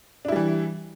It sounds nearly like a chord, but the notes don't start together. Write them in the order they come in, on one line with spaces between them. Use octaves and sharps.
D4 E4 G3 E3